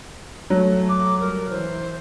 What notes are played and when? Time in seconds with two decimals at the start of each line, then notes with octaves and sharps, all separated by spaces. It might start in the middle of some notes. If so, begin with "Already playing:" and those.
0.50 F#3 A3
0.89 D6
1.20 G3 A#4
1.50 E3 C5